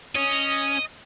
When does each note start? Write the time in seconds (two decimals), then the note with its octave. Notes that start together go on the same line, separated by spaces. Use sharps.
0.15 C#4 D#5